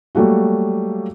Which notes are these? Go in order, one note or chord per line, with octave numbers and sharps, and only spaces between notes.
F#3 G3 A3 A#3 F#4